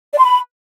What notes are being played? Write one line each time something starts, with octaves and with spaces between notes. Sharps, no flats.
D5
C6
B5